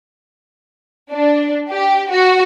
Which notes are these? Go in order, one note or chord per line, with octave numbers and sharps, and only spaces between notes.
D4
G4
F#4